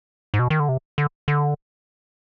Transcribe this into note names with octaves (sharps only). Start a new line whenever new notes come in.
G#2
B2
D#3
D3
C3
D3
D3